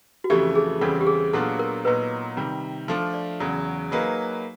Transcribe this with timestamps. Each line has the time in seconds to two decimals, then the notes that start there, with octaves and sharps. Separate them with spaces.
0.24 F#4
0.30 F2 C#3 E3 A3 G4
0.55 G#4
0.81 E2 C#3 E3 G3 C4 A4
1.01 G4
1.07 G#4
1.33 A#2 F#3 B3 D4 F4 A4
1.59 A#4
1.85 A#2 F#3 B3 D#4 B4
2.37 C3 D#3 G3
2.88 F3 A3 D4 F4
3.14 D5
3.40 E2 C#3 F#3
3.91 F#3 A#3 D#4 G#4 B4